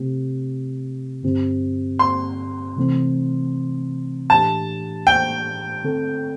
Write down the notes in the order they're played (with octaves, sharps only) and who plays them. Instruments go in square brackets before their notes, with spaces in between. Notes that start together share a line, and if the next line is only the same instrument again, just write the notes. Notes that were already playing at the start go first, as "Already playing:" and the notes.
Already playing: [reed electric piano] C3 A3 C4 G4
G2 D3 C4 G4
[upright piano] C6
[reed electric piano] C3 E3 A3 C4
[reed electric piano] A2 E3 A3 D4 G4 [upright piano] A5
[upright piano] G5
[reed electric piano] D3 A3 C4 A4